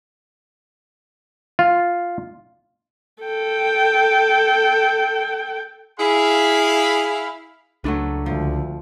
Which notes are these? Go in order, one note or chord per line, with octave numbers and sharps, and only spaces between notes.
F4
A4 G5
E4 G#4 F5 B5
C#2 F#3 A3 D4 B4
D2 F3